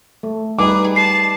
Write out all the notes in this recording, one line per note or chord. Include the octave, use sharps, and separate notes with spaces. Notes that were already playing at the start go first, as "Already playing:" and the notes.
A3
G3 D#4 G#4 B4 D6
A5 C7